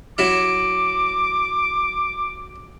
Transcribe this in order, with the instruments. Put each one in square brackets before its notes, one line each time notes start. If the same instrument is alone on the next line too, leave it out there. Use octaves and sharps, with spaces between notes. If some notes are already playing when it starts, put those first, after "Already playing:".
[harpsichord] F#3 E4 E5 [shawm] D6